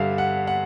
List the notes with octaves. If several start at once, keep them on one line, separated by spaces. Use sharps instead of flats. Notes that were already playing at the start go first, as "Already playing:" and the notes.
Already playing: G2 D3 G3 E5 F5
F#5
F#5